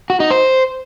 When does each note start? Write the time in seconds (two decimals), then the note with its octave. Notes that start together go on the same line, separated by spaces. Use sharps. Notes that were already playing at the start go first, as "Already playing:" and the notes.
0.10 F#4
0.20 D#4
0.31 C5